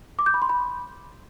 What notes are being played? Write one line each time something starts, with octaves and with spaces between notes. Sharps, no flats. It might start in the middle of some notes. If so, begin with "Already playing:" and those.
D6
G6
B5
C6
B5